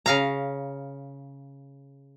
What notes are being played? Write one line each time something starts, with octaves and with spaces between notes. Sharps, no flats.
C#3 F5 A#5